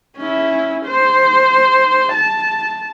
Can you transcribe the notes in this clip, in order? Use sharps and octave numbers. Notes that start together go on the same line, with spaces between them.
C#4 E4
C5
A5